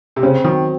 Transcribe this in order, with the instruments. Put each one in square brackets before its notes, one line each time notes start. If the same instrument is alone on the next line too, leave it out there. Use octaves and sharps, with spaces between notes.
[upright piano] C3
[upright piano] C#3 [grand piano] C4
[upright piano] D#3 [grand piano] F#3